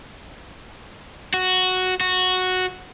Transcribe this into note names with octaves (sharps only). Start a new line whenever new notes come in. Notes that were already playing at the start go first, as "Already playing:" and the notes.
F#4
F#4